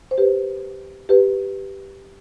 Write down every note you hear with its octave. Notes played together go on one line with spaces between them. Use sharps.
C5
G4 B4
G4 B4